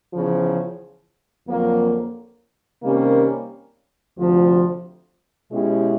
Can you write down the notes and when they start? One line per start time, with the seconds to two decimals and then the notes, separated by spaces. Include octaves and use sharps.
0.13 E2 C#3 F3
1.47 F2 D3 F#3 A#3
2.82 C3 D#3 G3 A#3 C#4
4.17 D2 C3 F3
5.51 B2 G#3 C#4 E4 G4